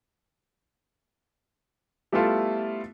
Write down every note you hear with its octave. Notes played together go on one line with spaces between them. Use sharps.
G3 A3 B3 E4 F4 A4